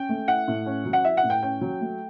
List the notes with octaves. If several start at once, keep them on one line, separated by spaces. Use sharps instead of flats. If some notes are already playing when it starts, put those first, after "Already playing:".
Already playing: C#4 G5
A3
E4 F#5
A2
C#4
F#3
F#5
E4 E5
F#5
A2
G5
C#4 G5
F#3
A3